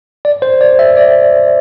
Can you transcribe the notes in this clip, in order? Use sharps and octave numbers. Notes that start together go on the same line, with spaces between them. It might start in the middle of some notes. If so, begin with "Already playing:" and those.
D5
C5
D5
E5
D5